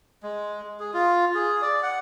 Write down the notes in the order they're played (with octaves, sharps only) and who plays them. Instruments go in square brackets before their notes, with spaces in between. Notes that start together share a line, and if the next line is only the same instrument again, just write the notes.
[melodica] G#3
G#4
F4
G#4
D5
F#5